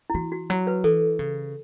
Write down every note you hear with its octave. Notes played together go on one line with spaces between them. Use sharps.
E4
E3 F#4
F#4
F#3 F#4
B4
E3 A4
C#3